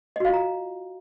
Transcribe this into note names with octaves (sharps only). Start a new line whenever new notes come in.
F4 F#4 D#5 F5 A#5